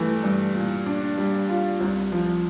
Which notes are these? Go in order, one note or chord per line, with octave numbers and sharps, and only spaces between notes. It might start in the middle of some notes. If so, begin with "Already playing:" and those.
Already playing: G2 E3 A3
G2
A#2
D4
G3
F4
C2
F3